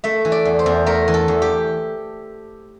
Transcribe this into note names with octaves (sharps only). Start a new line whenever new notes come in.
A3 E5
E3
D5
E2
C5
E2
A3 A#4
E3
A4
E2
G4